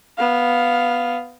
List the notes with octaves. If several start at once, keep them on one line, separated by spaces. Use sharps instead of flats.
B3 F5